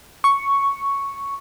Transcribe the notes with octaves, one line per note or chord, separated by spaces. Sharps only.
C#6